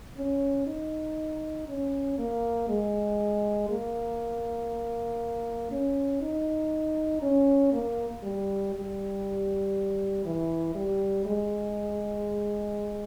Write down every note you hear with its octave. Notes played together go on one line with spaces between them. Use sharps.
C#4
D#4
C#4
A#3
G#3
A#3
C#4
D#4
C#4
A#3
G3
G3
E3
G3
G#3